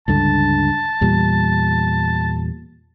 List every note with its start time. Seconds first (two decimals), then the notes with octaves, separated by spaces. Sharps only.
0.08 C#2 G2 D3 A5
1.01 E2 A#2 G3